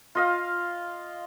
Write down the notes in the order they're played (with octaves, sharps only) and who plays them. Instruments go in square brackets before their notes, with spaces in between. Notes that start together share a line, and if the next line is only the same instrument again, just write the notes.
[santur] F4 D#5 F5